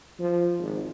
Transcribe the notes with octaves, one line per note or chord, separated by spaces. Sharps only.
F3
G#1